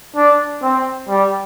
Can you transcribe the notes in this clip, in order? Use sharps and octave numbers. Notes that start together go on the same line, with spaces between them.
D4
C4
G3